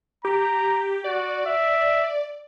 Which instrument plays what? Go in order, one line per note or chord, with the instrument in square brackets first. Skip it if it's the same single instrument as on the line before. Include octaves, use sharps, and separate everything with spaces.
[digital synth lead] G4 [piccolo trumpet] A#5
[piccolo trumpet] F#4 [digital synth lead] D5
[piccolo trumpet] E5